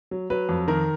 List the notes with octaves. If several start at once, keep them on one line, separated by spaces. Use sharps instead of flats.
F#3
F#3 B4
F2
D#3 A#4